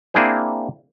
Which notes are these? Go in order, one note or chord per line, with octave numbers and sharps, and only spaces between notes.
A#3 C4 D4 E4 G#4 C5